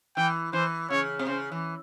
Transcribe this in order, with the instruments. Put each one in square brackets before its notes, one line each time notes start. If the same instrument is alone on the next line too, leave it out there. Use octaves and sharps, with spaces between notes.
[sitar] E3 [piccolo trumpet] G5
[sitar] E3 [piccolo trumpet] C5
[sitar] C#3 [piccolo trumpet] C#5
[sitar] C3
[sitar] C#3 [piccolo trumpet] C5
[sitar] E3